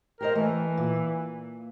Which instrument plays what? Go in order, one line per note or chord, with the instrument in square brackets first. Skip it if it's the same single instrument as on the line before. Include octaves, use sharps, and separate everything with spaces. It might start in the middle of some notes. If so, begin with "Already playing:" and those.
[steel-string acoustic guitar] G4 C5 D#5 [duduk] A#4
[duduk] E3 [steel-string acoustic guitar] A3
[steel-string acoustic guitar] A#2